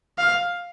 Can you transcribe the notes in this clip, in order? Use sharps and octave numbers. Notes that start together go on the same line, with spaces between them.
F5